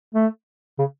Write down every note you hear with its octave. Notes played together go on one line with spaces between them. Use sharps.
A3
C#3